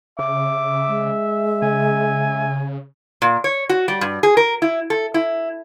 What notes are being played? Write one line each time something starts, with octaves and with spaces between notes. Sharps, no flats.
C#3 E5 D6
G#3
C#3 G#5
A#2
C#5
F#4
G3
G2
G#4
A#4
E4
A4
E4